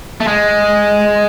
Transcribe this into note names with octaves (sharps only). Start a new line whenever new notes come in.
A3
G#3